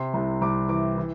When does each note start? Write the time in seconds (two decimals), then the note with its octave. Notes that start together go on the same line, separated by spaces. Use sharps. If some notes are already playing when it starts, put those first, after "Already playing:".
Already playing: C3 C6
0.14 C2
0.41 C2 D6
0.69 E3 D6
0.97 E3